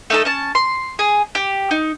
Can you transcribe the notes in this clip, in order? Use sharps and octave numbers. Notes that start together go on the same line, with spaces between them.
A3 D#4 A4
C#4 A5
C6
G#4
G4
D#4